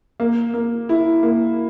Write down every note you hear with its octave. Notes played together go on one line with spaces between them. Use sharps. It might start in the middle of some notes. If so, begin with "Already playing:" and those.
A#3
A#3
E4
A#3